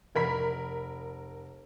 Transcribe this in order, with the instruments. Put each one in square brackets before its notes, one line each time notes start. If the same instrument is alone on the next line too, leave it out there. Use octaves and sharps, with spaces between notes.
[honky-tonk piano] F1 A#4 B5 B6